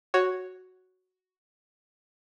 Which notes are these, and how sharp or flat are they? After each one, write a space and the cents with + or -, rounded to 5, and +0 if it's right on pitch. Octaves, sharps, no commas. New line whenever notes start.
F#4 +0 C#5 +0